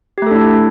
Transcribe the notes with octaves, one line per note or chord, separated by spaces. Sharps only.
A3 D4 E4 G4 A4